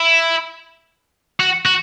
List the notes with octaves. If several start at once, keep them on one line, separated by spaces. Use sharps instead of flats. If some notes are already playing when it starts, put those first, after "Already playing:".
Already playing: E4
F#4
F#4